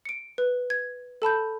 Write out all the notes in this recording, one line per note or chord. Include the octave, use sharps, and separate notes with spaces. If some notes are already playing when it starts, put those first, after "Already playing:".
C#7 D7
B4
G#6
A4 A5 B5 G6